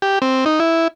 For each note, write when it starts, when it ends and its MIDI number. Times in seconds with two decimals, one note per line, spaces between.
0.02 0.19 67
0.22 0.45 60
0.46 0.60 63
0.60 0.88 64